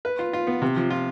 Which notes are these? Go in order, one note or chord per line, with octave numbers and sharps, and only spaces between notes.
B4
F4
F4
B3
C3
F3
F4